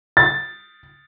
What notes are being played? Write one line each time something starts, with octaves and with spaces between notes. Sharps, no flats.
A6